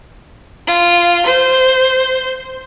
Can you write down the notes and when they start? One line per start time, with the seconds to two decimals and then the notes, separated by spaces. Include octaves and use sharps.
0.67 F4
1.26 C5